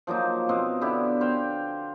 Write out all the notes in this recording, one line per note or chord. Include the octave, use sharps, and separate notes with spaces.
F3 F#3 A#3 D#4
B2 C4 D#5 F5
D3 B3 E4 G4
C5 F5 G5